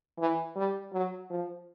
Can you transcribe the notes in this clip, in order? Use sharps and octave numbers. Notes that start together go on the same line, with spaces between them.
E3
G3
F#3
F3